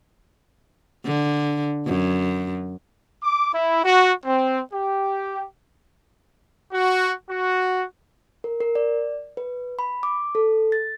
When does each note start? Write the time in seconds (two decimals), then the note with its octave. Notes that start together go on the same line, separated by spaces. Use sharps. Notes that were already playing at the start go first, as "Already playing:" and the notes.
1.05 D3
1.87 F#2
3.22 D6
3.53 E4
3.83 F#4
4.25 C4
4.73 G4
6.72 F#4
7.29 F#4
8.44 A#4
8.61 A#4
8.75 D5
9.37 B4
9.79 B5
10.03 D6
10.35 A4
10.72 A6